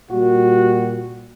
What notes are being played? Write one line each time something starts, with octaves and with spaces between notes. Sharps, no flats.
A#2 G3 F#4